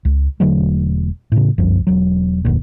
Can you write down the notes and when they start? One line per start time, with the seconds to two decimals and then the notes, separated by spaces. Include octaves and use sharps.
0.05 C#2
0.40 E1 D3 F#3 A3
1.32 A2 C#3
1.58 G1 C2 F#2 F3
1.87 E1 F#3
2.45 F1 D2 A#2